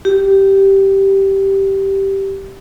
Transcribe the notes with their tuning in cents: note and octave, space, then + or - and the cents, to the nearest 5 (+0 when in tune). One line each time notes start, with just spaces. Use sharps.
G4 -10